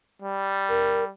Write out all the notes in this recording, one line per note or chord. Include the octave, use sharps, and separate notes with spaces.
G3
A#4